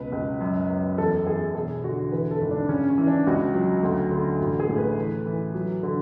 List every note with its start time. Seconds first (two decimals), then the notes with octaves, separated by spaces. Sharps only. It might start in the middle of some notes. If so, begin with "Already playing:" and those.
Already playing: C#2 B2 B4
0.12 C#2
0.41 F#2
0.70 F#2
0.98 E2 A4
1.27 E2 G#4
1.55 E1 G#4
1.84 D3 F#4
2.12 E3 B4
2.31 A4
2.41 G#1
2.51 D4
2.69 C#3 C#4
2.89 C#4
2.98 E3
3.07 D4
3.27 C#2 F#4
3.54 F#3
3.83 D2
4.11 D3
4.40 A1 F#4
4.60 G#4
4.69 A2
4.78 B4
4.97 E3
5.26 E3
5.54 F#3
5.83 D3